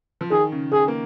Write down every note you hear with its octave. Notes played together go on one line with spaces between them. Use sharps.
F3
D#3 G#4
C#3
D#3 G#4
A#3